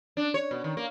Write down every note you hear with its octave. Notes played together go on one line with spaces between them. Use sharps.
D4
C#5
B2
D#3
A#3